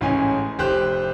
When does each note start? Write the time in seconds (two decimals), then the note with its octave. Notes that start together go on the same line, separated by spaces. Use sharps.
0.01 A1 G#2 C#4 D#4 G#5
0.58 F1 G4 C5 F#6